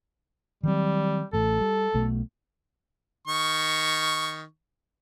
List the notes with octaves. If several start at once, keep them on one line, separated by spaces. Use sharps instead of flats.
D#3 F#3 G3 C4
A1 A2 A4
G3
B1 B2 A3
D#3 C#6